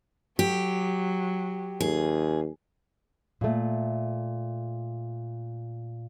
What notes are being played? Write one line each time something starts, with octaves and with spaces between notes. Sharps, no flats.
F#3 G4
D#2 G#4
A#2 A3